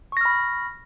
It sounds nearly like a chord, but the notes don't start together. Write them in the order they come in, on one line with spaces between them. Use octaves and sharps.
C#6 A#6 F6 B5